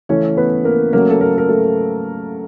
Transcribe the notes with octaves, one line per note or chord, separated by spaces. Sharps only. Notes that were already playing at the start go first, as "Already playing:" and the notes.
C#3 E3 A3 C#4 C#5
B3 B4
A#3 A#4
C#3 F#3 A3 A#3 A#4
A4
A#3 A#4
A#4
A3 A4